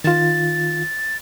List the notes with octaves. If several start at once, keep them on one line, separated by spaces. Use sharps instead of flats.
D#3 F4 A6